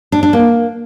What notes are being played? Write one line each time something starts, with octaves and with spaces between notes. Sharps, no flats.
D4
D4
A#3